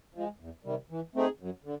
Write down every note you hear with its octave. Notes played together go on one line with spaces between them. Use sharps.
F3 G#3
E2
C3 D#3 G3
E3
A3 C4 D#4 G#4
F#2
D3